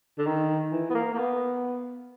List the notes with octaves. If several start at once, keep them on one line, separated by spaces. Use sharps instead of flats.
D3
D#3
E3
B3
A#3
A#3
B3